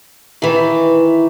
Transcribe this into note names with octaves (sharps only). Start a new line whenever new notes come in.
D#3 E3